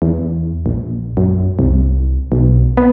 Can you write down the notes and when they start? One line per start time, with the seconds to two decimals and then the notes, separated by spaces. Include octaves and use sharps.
0.02 E2
0.66 A#1
1.17 F#2
1.59 C2
2.32 B1
2.77 B3